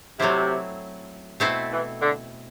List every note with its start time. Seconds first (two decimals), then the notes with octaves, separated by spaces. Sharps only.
0.20 C3 F#3 A3 C4 E4
1.40 B2 A3 C4 E4 A4
1.71 E3
2.01 D3